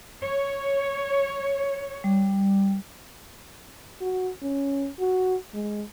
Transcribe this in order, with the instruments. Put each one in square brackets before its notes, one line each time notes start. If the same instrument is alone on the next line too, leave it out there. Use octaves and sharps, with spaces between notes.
[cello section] C#5
[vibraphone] G3
[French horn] F#4
C#4
F#4
G#3